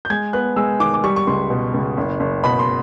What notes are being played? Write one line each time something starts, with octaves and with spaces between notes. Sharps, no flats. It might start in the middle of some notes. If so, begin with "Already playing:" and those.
G6
G#3 G#6
B3 F#6
G#3 E6
D#3 D6
D6
G3 C#6
C#6
C#2 C6
B2
C#2
F#1
F#1
B2 B5
C6